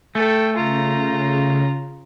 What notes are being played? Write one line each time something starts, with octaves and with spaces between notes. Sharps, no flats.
A3 A4 G5
C#3 F4 A#5